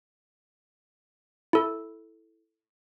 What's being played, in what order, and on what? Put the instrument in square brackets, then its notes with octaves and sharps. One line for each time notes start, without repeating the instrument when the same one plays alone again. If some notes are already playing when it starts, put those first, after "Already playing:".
[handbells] E4 A4